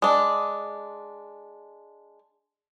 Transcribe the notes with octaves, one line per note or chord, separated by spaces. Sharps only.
G#3 D4